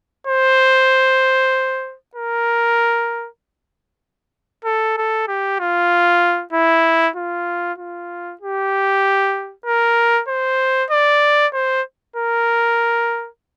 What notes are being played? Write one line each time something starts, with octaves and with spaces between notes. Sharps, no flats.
C5
A#4
A4
A4
G4
F4
E4
F4
F4
G4
A#4
C5
D5
C5
A#4